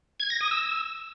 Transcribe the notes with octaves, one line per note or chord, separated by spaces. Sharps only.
G#6
A#6
D#6
E6